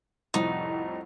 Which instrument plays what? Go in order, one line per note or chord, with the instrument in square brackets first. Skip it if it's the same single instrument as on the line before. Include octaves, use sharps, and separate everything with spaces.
[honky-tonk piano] C2 F2 A2 [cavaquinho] D#4